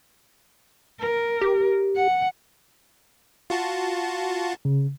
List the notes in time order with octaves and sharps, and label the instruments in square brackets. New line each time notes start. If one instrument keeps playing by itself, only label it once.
[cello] A#4
[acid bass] G4
[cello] F#5
[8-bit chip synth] F4 F#4 A5
[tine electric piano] C#3